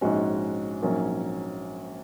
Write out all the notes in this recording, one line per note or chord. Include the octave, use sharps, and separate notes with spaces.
A#1 G#2 G#3 C#4 F#4
A#1 G#2 F#3 A#3 C#4